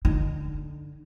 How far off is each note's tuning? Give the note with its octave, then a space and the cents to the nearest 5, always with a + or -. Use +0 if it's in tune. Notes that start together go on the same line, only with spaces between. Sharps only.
D3 +0 D#4 -20